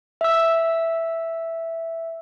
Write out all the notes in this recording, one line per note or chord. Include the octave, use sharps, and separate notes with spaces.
E5 E6